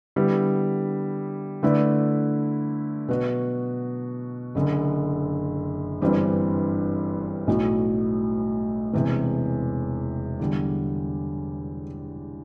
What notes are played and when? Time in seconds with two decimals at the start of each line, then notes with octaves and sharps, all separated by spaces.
0.16 D3 G3 B3 E4 G4
1.63 D3 A3 E4 B4 D5
3.08 B2 F#3 B3 F#4
4.55 F#1 F#2 D3
6.01 G1 G2 E3 G3 C4
7.47 B1 A2 F#3
8.93 E1 E2 C3 E3
10.40 E2 D3 G3